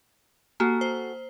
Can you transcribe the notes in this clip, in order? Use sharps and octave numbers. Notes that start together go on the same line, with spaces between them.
A#3 F#4 A4 G#5
C5